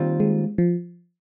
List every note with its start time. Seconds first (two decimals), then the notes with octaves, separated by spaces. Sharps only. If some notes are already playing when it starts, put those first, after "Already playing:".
Already playing: D#2 D#3 G3 C4 F4
0.20 G#3
0.58 F3